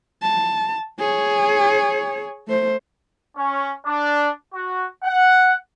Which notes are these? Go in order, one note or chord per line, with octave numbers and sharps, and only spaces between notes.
A5
G#4 C#5
A3 C5
C#4
D4
F#4
F#5